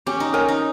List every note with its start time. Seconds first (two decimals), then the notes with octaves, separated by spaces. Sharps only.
0.06 C#4 G4
0.20 D#4
0.33 C#4 A#4 C#5 G#5
0.49 D#4